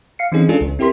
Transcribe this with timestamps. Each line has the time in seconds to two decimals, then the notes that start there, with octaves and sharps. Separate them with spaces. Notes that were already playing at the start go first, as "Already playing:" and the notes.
0.19 F5 C7 C#7
0.32 E3 C4 C#4 D#4 G#4
0.49 G#3 C#4 D4 F4 G#4 A4
0.61 C#2
0.79 C4 E4 G4 A#4 C6 B6